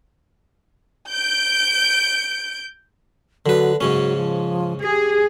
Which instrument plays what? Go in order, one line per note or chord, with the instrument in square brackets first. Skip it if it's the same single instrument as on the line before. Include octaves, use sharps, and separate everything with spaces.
[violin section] G6 D7
[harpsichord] D3 B4 [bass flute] F#3
[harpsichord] G#2 C#3 C#4 [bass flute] F#3
[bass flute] F3
[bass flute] G4 [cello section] G#4